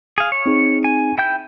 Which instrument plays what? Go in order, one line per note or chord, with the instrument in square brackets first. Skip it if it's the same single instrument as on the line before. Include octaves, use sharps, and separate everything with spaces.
[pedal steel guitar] G#4 F5
C#5
[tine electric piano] C4 D#4 G#4
[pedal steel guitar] G#5
E4 G5 G6